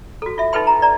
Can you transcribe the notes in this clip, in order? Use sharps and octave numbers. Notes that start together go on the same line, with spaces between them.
F#4 A4
F4 E5
D#4 F4 A4 B4 G5 C6
A#5
D5 A#5